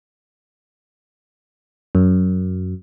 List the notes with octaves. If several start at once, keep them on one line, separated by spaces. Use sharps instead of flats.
F#2